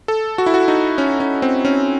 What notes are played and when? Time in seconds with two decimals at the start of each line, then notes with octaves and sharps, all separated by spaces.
0.08 A4
0.38 F#4
0.46 E4
0.54 F#4
0.68 D#4
0.98 C#4
1.20 C#4
1.42 C4
1.65 C#4